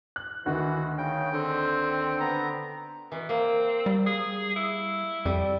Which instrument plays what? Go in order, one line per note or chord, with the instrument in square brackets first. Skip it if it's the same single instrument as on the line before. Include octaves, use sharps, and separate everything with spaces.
[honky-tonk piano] F#6
[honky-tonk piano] D2 D#3 [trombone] E3 [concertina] F#4
[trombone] C#3 [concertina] G5
[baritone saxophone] D3 [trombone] C4
[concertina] B3 A#5
[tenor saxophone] B2 [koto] E3
[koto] A#3 [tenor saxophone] C4
[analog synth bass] G3
[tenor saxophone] G#4
E4
[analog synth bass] F2 [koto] G3